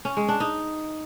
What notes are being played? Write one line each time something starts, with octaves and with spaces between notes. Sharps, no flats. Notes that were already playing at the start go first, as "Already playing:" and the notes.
C#4
G#3
D4
D#4